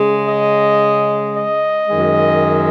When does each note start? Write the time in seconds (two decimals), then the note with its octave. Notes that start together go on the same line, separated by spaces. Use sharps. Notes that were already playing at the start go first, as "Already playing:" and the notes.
Already playing: C#3 G#3
0.28 D#5
1.35 D#5
1.88 F#2 D#3 G#3